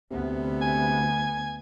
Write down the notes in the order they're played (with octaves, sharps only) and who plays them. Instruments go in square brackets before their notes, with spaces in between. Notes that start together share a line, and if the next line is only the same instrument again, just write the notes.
[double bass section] D2 B3 [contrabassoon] C3
[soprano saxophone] G#5